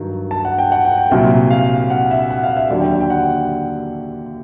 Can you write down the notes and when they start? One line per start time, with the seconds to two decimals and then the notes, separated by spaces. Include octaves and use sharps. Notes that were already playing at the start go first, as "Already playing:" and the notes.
Already playing: G2 D#3 F#3
0.31 A5
0.45 F#5
0.58 G5
0.72 F#5
0.85 G5
0.98 G5
1.11 C2 A#2 F#3
1.51 F5
1.90 F#5
2.11 E5
2.31 F#5
2.44 F5
2.57 E5
2.70 D#2 D3 F#3 D5
2.80 G5
3.00 G5
3.10 F#5